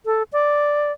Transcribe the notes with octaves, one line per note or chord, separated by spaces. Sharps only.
A4
D5